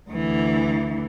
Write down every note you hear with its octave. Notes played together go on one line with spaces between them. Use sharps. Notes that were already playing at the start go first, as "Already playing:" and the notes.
D2 E3